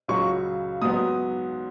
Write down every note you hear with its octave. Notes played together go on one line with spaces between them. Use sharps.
C#2 C#3 F#3 C#6
G#2 F#3 B3 D#6